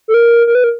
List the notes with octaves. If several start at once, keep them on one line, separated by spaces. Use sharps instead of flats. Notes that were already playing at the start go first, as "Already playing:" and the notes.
A4
A#4
A#4
B4
A#4